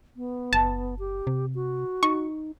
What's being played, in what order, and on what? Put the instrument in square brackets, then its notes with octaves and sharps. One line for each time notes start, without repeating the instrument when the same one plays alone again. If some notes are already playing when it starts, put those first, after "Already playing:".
[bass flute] B3
[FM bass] F#1 [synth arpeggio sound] A5
[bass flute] G4
[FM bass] C3
[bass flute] F#4
[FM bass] D#4 [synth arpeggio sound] C#6